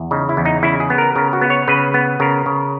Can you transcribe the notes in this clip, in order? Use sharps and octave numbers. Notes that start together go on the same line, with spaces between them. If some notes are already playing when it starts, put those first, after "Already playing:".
Already playing: E2
C#3 D#4
E4
E2
D#4
C#3 E4
G#4
B3
A#4
C#3 A#4
F#4
B3
C#5
C#3 B4
B3
C#3 A#4
C#3